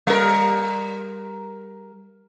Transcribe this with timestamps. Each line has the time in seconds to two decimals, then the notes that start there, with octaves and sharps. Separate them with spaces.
0.07 G3 A#4